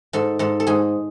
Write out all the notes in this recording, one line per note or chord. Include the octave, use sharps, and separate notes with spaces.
G#2 A4
G#2 A4
A4
G#2 G#4